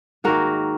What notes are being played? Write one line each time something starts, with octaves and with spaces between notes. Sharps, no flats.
G#2 D#3 A#3 F#4 A#4